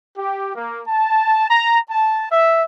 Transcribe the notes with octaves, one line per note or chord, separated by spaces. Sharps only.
G4
A#3
A5
A#5
A5
E5